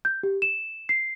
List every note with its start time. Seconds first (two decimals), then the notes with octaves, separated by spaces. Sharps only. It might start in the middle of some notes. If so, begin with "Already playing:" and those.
0.05 G6
0.23 G4
0.42 E7
0.89 C7